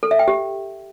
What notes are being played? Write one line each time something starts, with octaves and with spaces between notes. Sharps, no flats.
A4
E5
G5
G4